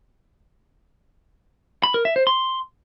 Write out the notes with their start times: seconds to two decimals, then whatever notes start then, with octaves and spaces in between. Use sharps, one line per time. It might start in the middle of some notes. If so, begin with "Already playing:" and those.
1.84 B5
1.94 A#4
2.05 E5
2.16 C5
2.27 C6